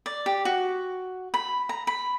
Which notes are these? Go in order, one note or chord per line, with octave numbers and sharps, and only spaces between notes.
D5
G4
F#4
B5
A#5
B5